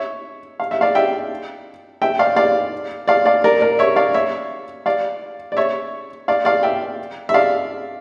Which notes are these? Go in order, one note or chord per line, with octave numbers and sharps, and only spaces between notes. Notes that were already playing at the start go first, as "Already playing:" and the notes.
Already playing: C#5 E5
F5
E5
D5 F5
E5 G5
E5 G5
D5 F5
D5 F5
D5 F5
D5 F5
A#4 D5
A#4 D5
C#5 E5
D5 F5
C#5 E5
D5 F5
D5
C#5 E5
D5 F5
D5 F5
E5 G5
E5
D5 F5